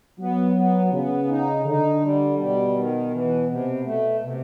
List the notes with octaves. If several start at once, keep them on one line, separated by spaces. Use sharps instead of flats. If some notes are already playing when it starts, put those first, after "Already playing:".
F#3 B3
B3
C#3 B3
D#4
D3 D#4
G3
B2 G3
D#3
E3
C3
A3
C3